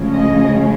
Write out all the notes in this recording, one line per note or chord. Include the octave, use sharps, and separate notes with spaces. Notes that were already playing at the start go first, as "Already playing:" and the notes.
Already playing: D2 C#3 F3 G#3 C#4
D#5